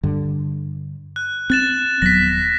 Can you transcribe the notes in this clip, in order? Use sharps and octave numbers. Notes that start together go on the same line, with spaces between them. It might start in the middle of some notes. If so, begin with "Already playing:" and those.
G2 D3
F#6
C4 F#6 A6 E7
D#1 F#3 B3 A#6 B6